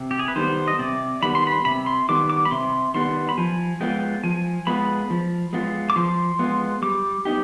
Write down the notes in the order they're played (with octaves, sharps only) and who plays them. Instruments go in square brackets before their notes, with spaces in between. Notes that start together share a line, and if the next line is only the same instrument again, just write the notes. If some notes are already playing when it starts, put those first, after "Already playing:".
Already playing: [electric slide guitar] C3
[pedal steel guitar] G4
G#4
B4
[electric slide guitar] D#3 G3 B3 [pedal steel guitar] C5
[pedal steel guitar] D#5
[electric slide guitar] C3 [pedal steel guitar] D5
[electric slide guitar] D#3 G3 B3 [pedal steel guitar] B5
[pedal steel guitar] C6
B5
[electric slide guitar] C3 [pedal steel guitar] B5
[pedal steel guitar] C6
[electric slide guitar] D#3 G3 B3 [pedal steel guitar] D6
[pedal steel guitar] D6
B5
[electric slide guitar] C3 [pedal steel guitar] C6
[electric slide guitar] D#3 G3 B3 [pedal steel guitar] C6
[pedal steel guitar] B5
[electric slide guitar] F3 [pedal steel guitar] G#5
[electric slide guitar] G#3 B3 F4 [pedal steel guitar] G5
[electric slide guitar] F3 [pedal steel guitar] G#5
[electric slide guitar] G#3 B3 F4 [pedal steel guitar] B5
[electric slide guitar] F3
G#3 B3 F4
[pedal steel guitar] D6
[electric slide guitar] F3 [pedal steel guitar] C6
[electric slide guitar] G#3 B3 F4
[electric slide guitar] G3 [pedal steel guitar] D6
[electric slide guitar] B3 D#4 G4